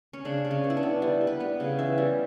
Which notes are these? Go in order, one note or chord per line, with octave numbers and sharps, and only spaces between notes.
C#4
C#3 D4
C#3
C#4
B3
E4
D4
B3
G3 E4
G3
B4
B3
C#3
E3 E5
G3